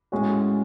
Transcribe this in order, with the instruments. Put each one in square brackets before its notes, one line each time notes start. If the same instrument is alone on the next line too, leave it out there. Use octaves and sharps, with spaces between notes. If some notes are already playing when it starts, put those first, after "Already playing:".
[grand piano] A2 G#3 C#4 F#4